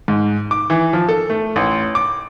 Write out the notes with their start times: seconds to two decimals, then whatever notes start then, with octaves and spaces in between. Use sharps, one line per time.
0.08 G#2
0.51 D6
0.70 E3
0.93 F3
1.09 A4
1.30 A3
1.56 A1
1.95 D6